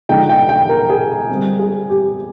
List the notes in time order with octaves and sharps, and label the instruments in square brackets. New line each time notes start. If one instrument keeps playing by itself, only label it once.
[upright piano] D3 F3 G#3 D#4 G5
G5
G5
A#4
G#4
D3 G3 C4
G#4
G4